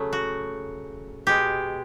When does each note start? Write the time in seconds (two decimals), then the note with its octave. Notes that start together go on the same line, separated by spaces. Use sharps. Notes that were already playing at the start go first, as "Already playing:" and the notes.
Already playing: C#3 F#3 A3
0.13 F#4
1.27 B2 G#3 G4